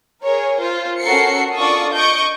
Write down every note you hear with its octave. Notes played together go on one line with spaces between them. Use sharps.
G#4 A#4 C#5
F4 C5
C#4 F#4 A4 A#4 C7 C#7
D4 F4 A4 D5 C#6 D#6
D#5 C#6 G6 C#7 D7